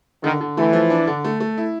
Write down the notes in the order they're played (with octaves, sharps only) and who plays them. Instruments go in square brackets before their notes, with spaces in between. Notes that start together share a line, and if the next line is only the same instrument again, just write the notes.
[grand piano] D3 [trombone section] D#3
[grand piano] D3
[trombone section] E3 [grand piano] A3
[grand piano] F3
D4
D3
A3
A3
E4